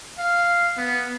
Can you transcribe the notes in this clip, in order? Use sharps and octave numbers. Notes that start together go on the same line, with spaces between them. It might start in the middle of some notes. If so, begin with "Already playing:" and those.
F5
B3